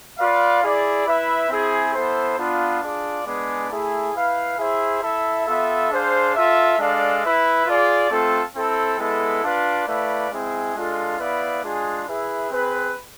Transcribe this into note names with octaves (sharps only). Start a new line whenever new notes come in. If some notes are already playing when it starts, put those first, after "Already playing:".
F4 B4 D5 F5
E4 G#4 D5
E4 B4 E5
C4 E4 G#4
B3 E4 A4 C5
B3 D4 F4
D4 F4 G#4 D5
G#3 B3 D4 G#4 D5
A3 E4 G#4
E4 B4 F5
E4 G#4 C5 E5
E4 A4 E5
B3 F4 A4 E5
D4 G#4 C5 F5
F4 A4 E5
G#3 D4 A4 D5 F5
E4 B4 E5
F4 G#4 D5
A3 C4 F4 A4
C4 E4 A4
G#3 B3 E4 A4
D4 F4 B4 D5 F5
A3 E4 B4 D5 F5
G#3 C4 E4 G#4
G#3 D4 F4 A4
B3 E4 B4 D5 F5
G#3 D4 F4 G#4
E4 G#4 B4 E5
C4 G#4 B4